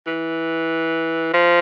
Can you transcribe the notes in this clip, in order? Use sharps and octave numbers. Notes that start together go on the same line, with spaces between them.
E3
F3